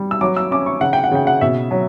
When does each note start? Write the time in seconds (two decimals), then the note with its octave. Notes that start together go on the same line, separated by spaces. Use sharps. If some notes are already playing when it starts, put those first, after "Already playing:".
Already playing: G3
0.11 E6
0.21 F#3 D6
0.37 E6
0.51 C#4 D6
0.66 C#6
0.81 C#3 F#5
0.93 G5
1.04 F#5
1.11 C#3 G5
1.27 F#5
1.41 B2 E5
1.71 F#3